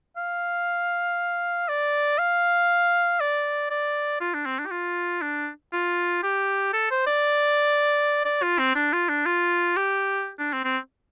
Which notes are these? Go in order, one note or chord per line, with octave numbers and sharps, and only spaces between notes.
F5
D5
F5
D5
D5
F4
D4
C4
D4
G4
F4
D4
F4
G4
A4
C5
D5
D5
F4
C4
D4
F4
D4
F4
G4
D4
C4
C4